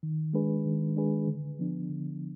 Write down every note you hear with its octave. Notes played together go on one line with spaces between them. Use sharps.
D#3
G#3 D4 G#4 B4
D#3
G#3 D4 G#4 B4
D3
F3 B3 D4
D3